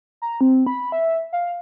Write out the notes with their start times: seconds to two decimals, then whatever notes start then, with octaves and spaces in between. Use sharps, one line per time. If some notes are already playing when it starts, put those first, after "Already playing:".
0.22 A#5
0.41 C4
0.67 B5
0.92 E5
1.33 F5